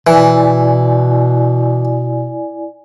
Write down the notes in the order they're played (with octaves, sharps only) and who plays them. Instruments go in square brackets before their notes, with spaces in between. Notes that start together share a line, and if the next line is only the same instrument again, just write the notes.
[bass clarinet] B2 [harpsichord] E3 [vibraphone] E4 D5 G#5